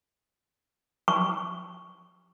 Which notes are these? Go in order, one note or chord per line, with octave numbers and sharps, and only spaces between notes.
C#6